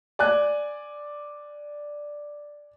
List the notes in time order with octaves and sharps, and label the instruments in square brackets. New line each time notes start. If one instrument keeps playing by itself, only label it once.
[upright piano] D5 G#5 F#6